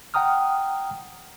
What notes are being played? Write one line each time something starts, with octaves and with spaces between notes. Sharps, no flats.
F#5 G5 A#5 D#6 F6